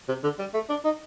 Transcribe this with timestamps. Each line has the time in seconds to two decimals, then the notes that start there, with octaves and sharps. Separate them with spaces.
0.08 C3
0.24 D3
0.39 G3
0.54 A3
0.69 D4
0.84 D#4